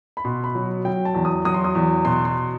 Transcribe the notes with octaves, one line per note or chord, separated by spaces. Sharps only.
B5
B2 C6
B5
F#3
F#3 G5
A5
E2
D#6
F#3 D#6
C6
D#6
E2
B2 C6
C6